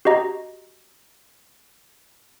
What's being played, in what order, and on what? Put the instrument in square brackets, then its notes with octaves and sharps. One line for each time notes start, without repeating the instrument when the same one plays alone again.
[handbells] F#4 G4 D#5 A#5